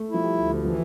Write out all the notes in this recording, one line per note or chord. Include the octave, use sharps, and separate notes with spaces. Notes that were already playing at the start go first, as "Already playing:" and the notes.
Already playing: A3
F3 E4
G3
D2
E3 F3